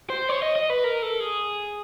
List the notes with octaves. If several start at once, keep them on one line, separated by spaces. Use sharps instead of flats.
C5
C#5
D#5
D#5
B4
A#4
A4
G#4